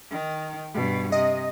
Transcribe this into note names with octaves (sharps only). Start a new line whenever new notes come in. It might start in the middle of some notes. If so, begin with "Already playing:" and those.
D#3
G2 B2
C3 D#5